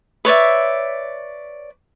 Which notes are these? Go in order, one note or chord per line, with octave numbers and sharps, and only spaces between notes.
B4 C#5 D5 E5